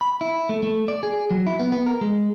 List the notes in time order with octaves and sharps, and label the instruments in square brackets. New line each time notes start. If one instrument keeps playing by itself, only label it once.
[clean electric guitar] B5
E4
A3
A3
D5
G#4
F#3
E4
B3
B3
A#4
G#3